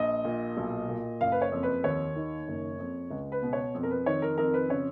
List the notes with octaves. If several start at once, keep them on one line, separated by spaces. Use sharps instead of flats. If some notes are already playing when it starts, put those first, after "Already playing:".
Already playing: A#1 D#5
A#2
B1
A#2
F#1 F5
B4
C#5
F2
B4
D#2 C#5
D#3
F#1
F2
C#2
B4
B2
C#5
F2
A#4
B4
D#3 C#5
A#4
F2 A#4
B4
C#3 C#5